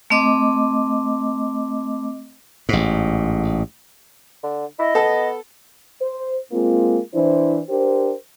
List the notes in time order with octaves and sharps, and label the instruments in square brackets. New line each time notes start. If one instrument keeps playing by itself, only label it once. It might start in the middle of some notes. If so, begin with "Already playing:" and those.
[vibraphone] A3 C4 D#5 D6
[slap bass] A1 G#2
[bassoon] D3
[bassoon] E4 [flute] D#5
[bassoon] B3 [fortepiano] A4
[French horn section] C5
G#3 A#3 C4 F4
E3 D4 E4 C5
D4 G4 A#4 C5